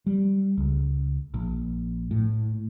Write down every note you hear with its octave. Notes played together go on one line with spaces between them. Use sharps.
G3
C#2
A#1
A2